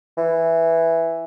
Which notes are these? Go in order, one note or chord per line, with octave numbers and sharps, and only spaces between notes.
E3